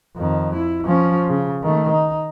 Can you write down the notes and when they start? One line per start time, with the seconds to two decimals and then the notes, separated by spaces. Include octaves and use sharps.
0.16 F2 D#3
0.56 E4
0.85 F3 C#4
1.29 C#3
1.63 D#3 A3
1.92 D#4